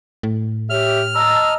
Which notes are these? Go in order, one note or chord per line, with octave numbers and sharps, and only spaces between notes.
A2
G4 C#5 E5 F6
D#5 A5 A#5 E6